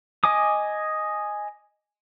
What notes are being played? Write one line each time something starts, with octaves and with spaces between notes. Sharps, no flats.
D#5 G#5 D6 D#6